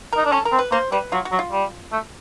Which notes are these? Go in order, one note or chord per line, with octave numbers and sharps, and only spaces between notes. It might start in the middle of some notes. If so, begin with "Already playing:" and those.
D#4 A#4
D4
C#4 A4
A#4
C4
B4
A#3 C5
G3 B4
F#3 F4
F#4
F#3
F4
G3
A3